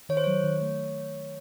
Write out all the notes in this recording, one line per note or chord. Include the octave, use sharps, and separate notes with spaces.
D#3 C#5
C5
F#3 C#5
D#3
A3